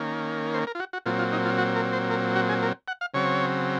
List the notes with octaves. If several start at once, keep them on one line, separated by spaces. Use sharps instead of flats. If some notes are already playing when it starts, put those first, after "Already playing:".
Already playing: D#3 A#3 C#4
C5
A#4
F4
F#4
F#4
A#2 F#3 C4 F4
F4
D#4
F4
F#4
A#4
C5
A#4
F#4
G#4
A#4
F#5
F5
C#3 F#3 C4 C#5